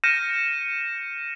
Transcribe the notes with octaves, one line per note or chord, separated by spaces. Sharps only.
F6 G6 A#6 C#7 D#7 E7